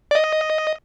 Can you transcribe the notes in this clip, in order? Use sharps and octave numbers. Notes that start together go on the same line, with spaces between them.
D5
D#5